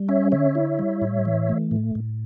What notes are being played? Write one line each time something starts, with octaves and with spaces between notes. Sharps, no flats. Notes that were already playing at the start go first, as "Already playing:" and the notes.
Already playing: G3
C#4 C#5 E5
D3 C#5 E5
E4
G3
A2
E3
A3
A2
A2